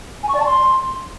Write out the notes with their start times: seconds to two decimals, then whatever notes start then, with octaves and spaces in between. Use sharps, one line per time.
0.23 G#5
0.29 C#6
0.34 D5
0.40 A5
0.46 C6